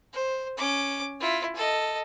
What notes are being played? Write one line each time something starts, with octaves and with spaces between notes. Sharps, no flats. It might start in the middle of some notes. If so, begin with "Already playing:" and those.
C5
C#4 D6
E4 F4
A4 D#5